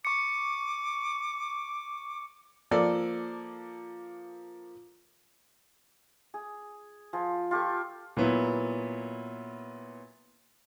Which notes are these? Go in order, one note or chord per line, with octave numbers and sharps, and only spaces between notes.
C#6 D6 C#7
F3 A#3 A4 D5
G#4
F3 G#4
F4 G4 A4 C#6
A#2 F#3 B3 E4